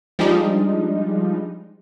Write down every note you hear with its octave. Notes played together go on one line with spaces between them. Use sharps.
F3 G3 G#3 D4 D#4